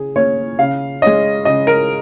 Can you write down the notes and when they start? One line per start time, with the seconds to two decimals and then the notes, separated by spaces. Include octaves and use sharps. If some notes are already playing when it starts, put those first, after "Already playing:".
Already playing: C#3 G#4
0.16 A#3 C#4 C#5
0.59 C#3 F5
1.02 G#3 C#4 D#5
1.45 C#3 D#5
1.67 A#4